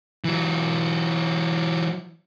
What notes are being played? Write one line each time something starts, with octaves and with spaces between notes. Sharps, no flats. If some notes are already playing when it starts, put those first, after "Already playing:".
E3 F#3